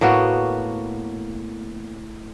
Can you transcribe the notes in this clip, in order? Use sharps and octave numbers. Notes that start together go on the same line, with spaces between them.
A2 A#3 B3 F#4